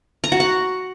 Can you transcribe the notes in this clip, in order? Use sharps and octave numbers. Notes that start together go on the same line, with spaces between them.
A#5
F#4
F#5